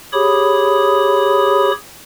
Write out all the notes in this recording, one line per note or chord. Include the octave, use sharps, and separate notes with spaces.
G4 G#4 C#5 B5 D#6